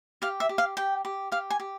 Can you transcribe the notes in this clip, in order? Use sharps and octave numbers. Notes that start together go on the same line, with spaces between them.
G4 F5
E5
G4
F5
G4 G5
G4
G4 F5
G#5
G4